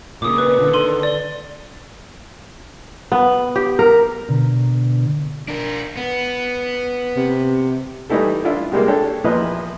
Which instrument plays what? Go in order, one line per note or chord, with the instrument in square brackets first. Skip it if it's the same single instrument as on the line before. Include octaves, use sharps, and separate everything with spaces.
[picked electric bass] A#2 C#3 [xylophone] D6 D#6
[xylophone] B4
[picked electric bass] D3 D#3
[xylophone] A4 C6 D#7
D5 G7
[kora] B3
G4
A#4
[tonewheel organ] B2 D3
[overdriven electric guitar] D4 A#4
B3
[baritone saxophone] C3
[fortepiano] E3 G3 A3 D#4 E4 A4
D4 E4 F4
C3 G3 G#3 A#3
D4 G4 A4 C#5
E2 A#2 F3 B4 D#5 E5